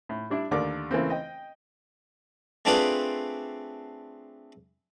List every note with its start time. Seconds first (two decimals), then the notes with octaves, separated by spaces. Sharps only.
0.09 A2
0.30 G3 D4 E4
0.51 D#2 D3 A3 A#4 D5 D6
0.91 C#3 E3 A3 A#3 C4
1.10 D#5 G5
2.65 A3 C4 D4 F4 G#4 B4